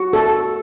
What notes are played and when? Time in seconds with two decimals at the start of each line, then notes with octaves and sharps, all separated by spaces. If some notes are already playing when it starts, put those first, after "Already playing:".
Already playing: F#4
0.13 A4